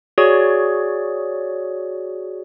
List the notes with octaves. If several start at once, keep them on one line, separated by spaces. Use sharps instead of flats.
F#4 G#4 C#5 D5